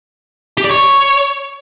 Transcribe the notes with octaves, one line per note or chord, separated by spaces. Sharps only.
G4
D5
C#5